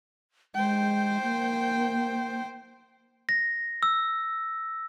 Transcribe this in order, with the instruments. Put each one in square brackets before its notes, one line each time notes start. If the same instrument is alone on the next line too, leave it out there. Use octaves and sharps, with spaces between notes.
[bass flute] G#3 [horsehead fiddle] C5 G5
[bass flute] A#3
[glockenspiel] A#6
E6